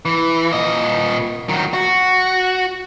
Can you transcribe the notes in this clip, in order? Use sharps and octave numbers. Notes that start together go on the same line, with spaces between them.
E3
A#2 D#5
D#3 F#3
F#4